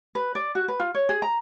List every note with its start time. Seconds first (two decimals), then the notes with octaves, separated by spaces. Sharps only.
0.15 B4
0.35 D5
0.55 F#4
0.68 B4
0.80 F4
0.95 C#5
1.09 G#4
1.22 A#5